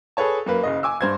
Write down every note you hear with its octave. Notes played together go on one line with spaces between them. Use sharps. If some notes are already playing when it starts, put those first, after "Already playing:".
G#4 A4 B4 C#5 A5
F#2 A#3 B4
F#1 C#3 D#5
G#5 D6 E6
G2 C5 G#6